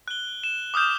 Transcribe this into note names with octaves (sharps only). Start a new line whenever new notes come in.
F#6 G7
E7
D6 D#6 F6 G6 E7